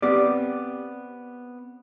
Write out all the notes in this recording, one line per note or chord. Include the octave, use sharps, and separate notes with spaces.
B3 C4 G4 D5